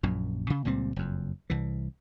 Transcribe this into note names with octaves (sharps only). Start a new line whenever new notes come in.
A#1 F#2 A#2
C#3
C#2 A#2 G3 C4
F#1 F2
C2 E3